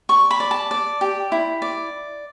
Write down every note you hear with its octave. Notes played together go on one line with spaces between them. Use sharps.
D5 C#6
B5
D5
A5
D5
G4
E4
D5